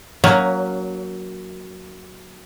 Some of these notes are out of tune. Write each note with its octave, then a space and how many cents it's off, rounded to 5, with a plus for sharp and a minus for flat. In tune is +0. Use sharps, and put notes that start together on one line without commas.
F#3 +0 A#3 +5 C#4 +25